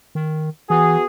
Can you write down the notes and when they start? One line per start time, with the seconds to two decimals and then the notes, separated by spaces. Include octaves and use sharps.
0.15 D#3
0.70 E3 B3 F#4 G#4